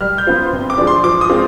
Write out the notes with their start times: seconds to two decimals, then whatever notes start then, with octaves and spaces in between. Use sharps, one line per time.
0.01 G3 F6
0.18 G6
0.27 B3 F4 C5
0.53 C3
0.70 D6
0.78 F3 G#3 D4
0.87 C6
1.04 F3 D6
1.21 D#6
1.29 G#3 C4 F4